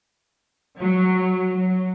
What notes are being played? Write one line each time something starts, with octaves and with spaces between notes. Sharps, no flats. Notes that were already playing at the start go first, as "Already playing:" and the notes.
F#3
F#3